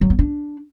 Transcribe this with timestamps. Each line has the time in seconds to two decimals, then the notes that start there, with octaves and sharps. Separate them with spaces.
0.01 F#3
0.10 B3
0.19 D4